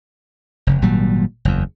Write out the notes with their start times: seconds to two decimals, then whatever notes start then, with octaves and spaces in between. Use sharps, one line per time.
0.67 F1 C#3
0.82 G#1 A#2 F#3 G3
1.45 F#1 E2